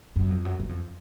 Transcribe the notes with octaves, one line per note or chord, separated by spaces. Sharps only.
F#2
F2
F#2
F#2
F2